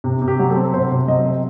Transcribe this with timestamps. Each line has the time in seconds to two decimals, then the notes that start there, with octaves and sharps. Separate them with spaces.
0.04 C3
0.22 C3
0.28 G4
0.39 F#3
0.50 A4
0.56 C4
0.74 C3 C5
0.91 C3
1.07 F#3 D#5
1.25 C4